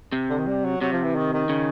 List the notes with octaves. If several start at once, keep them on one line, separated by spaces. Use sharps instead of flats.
C3
D3
D#3
G3
F#3
C3 F#3
F3
E3
D#3
D#3
C#3